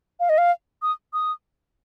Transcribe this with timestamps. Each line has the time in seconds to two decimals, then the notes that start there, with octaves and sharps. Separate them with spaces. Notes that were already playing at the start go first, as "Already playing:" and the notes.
0.20 F5
0.29 D#5
0.38 F5
0.82 D#6
1.13 D#6